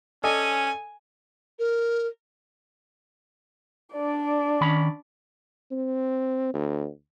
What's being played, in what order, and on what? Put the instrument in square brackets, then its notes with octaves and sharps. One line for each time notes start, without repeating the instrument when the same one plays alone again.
[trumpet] C#4 [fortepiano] A4 D5 D#5 [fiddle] G#5
[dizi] A#4
[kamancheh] D4 D5
[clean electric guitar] D#3 C#4 B5
[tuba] C4
D2